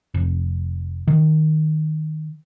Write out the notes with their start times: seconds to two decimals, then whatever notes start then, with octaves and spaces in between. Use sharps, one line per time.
0.14 F1
1.07 D#3